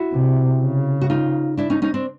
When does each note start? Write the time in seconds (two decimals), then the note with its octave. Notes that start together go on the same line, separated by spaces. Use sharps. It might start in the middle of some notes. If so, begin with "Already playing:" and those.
Already playing: E4 F#4
0.13 C3
0.61 C#3
1.01 F#4
1.10 D#4 F4
1.57 D4 E4
1.70 C#4 D#4
1.82 C#4 D#4
1.94 C4 D4